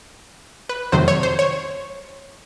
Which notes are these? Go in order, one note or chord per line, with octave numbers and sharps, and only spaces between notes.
B4
F2 C3 D#3 F#3 A3 C5
C#5
C5
C#5